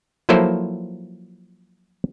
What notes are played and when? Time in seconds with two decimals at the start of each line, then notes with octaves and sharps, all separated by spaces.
0.29 F3 F#3 A#3 E4 A4 C5